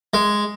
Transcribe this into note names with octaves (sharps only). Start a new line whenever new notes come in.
G#3